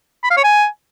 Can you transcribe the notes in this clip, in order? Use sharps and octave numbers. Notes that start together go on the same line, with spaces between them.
B5
F5
C#5
G#5